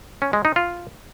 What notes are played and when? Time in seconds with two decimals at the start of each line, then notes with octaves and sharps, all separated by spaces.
0.22 C#4
0.33 G#3
0.45 D#4
0.56 F4